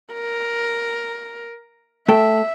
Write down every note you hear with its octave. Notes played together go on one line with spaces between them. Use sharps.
A#4
A3 A4 E5 G5